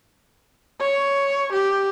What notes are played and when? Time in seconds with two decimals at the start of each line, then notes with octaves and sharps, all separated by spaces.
0.81 C#5
1.53 G4